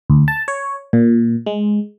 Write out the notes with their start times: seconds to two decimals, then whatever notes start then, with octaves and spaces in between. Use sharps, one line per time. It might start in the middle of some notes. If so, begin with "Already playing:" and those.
0.10 D2
0.28 A5
0.48 C#5
0.93 A#2
1.46 G#3